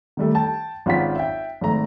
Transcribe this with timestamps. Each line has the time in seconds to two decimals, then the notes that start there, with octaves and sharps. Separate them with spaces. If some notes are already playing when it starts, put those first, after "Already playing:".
0.17 D#3 G3 A3
0.35 G5 A5
0.86 G#1 C#4 F4 F#5 G5 B6
1.16 E5 G5
1.61 G#1 A3 A#5